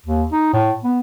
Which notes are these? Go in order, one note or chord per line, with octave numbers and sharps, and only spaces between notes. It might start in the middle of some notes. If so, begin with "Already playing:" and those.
D#2
D#4
A2
B3